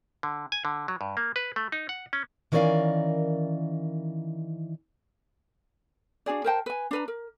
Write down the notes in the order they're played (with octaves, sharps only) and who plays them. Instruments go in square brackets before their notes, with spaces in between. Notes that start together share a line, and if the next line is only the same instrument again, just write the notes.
[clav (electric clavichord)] D3
G#5
D3
F#3
G2
A#3
B4
A3
D#4
F#5
C#4
[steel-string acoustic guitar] D#3 E3 C#4 A#4 D5 F5
[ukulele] D4 F#4 G#4 D5
A#4 C5 G5 A5
B4 G#5
D4 B4 A#5
A#4